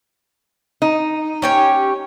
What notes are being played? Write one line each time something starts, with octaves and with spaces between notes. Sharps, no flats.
D#4
C#4 G4 C#5